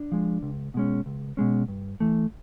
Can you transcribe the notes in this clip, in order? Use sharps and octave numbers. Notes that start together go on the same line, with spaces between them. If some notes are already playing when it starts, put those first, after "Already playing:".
Already playing: D4
F3 G#3
C#2
B2 G#3 C#4
C#2
B2 G#3 C#4
G2
E3 A3